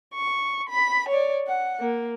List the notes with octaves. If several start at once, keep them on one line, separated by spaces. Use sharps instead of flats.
C#6
B5
C#5 D5
F#5
A#3